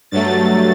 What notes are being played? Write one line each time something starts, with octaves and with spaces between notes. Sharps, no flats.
G2 F#3 A3 A6